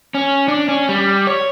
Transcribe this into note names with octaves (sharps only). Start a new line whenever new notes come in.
C#4
D4
C#4
G3
C#5